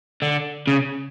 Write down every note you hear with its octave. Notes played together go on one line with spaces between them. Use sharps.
D3
C#3